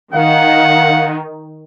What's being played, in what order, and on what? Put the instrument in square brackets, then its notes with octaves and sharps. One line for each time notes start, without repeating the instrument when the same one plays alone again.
[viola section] D#3 [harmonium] F5 [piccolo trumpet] F#5